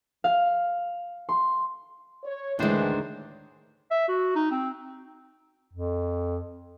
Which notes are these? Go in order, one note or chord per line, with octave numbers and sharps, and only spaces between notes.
F5
C6
C#5
D2 A2 D#3 E3 G#3 D4 C5
E5
F#4
D#4
C4
F2